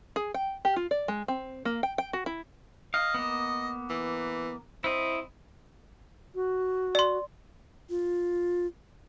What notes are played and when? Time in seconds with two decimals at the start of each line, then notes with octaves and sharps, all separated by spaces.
0.16 G#4
0.34 G5
0.65 G4
0.76 F4
0.91 D5
1.08 G#3
1.28 C4
1.65 A#3
1.83 G5
1.98 G5
2.13 F#4
2.26 E4
2.94 D#5 F5
3.14 A#3 B3
3.90 E3
4.84 C4 E4 D#5
6.35 F#4
6.95 D5 C6
7.90 F4